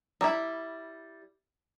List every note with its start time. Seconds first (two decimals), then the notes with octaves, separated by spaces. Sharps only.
0.21 G3 E4 A#5